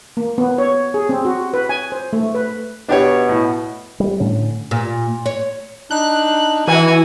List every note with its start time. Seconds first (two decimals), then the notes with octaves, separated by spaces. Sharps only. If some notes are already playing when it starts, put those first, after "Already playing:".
0.17 A#3
0.38 B3
0.58 C#5
0.94 G#4
1.09 C4
1.25 F#4
1.54 B4
1.69 G#5
1.92 C5
2.13 A3
2.35 B4
2.89 B2 D4 G4 C#5
3.29 A2
4.00 G3
4.20 A2 D3 C#4
4.71 A#2
5.26 C#5
5.91 D4 D#4 F#6
6.67 E3 F#4 G#5